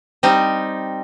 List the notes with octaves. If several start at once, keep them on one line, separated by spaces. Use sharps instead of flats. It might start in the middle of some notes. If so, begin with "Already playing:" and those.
G3 C4 D#4